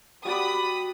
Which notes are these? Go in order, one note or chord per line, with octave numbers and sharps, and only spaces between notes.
G3 F#4 D5 B5 D#6